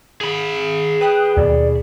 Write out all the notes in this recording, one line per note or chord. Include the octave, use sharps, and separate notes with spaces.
G#4 B5
B4 G5 D#6 F#6
D#2 B2 D5